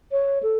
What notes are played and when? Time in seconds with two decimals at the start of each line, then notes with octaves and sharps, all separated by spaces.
0.12 C#5
0.43 A4